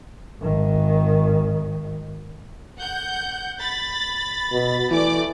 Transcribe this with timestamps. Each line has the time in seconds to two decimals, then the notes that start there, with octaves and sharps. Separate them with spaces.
0.42 G#1 D#3
2.78 F#5 G6
3.60 B5 A6
4.52 B2
4.91 E3 A3 D5 D6